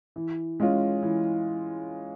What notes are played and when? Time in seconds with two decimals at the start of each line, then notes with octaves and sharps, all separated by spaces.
0.16 E3
0.60 G#3 C#4 F4
1.03 E3